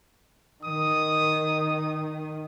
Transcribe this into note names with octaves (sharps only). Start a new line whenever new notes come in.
D#3 D#6